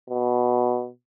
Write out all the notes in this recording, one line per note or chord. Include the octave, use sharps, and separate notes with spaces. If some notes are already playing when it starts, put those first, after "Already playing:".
B2